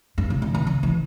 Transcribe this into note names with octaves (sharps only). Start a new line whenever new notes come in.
G2
C#3
D#3
E3
C#3
E3